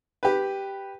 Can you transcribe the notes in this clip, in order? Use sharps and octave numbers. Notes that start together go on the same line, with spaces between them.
G4 B4